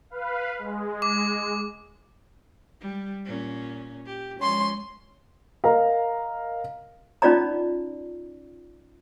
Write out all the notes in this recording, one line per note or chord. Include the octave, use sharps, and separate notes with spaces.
B4 F5
G#3
D6
G3
A#2 C#4
G4
F3 G#3 C#4 C6
A#4 D#5 F5 A#5
C#4 D#4 F4 D5 D#5 A#5